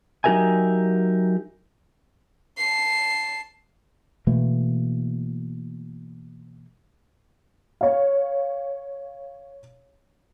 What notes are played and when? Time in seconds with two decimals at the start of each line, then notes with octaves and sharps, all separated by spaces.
0.24 F#3 D#4 G4 A#4 E5 G#5
2.57 A5 C7
4.27 B2 E3 A3 A#3
7.81 C#5 F5